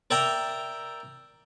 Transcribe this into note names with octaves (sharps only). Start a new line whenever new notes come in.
A#4 D5 E5 G5 A#5